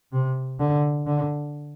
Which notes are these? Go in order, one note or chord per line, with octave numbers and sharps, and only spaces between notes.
C3
D3
D3